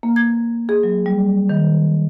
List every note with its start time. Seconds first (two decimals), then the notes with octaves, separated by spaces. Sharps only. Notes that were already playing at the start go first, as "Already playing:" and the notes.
0.03 A#3
0.16 G#6
0.69 G#4
0.83 F#3
1.06 G3
1.49 D#3